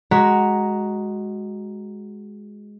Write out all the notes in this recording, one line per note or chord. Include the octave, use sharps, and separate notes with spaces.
G#3 F#4 A#5 B6